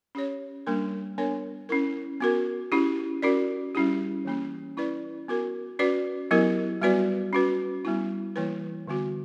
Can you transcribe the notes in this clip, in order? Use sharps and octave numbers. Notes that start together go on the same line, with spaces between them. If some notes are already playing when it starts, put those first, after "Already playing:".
C#4 G4 C#5
G3 A#3 D4 A#4
B3 D4 A#4 C#5
C#4 E4 A#4
B3 F#4 A#4
C#4 E4 G4
C#4 F#4 A#4 D5
G3 C#4 E4 G4
E3 A#3 C#4
C#4 E4 B4 D5
B3 F#4 A#4
C#4 F#4 B4 D5
F#3 B3 E4 G4 A#4
G3 B3 F#4 B4 D5
C#4 F#4 B4
G3 B3 E4
E3 G3 A#3 E4 B4
D3 G3 B3 F#4